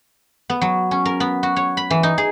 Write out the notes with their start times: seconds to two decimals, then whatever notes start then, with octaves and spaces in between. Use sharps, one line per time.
0.50 B3
0.61 F#3
0.91 C#4
1.05 A#4
1.20 B3
1.43 F#4
1.56 C#5
1.77 B5
1.91 E3
2.03 D#4
2.18 G#4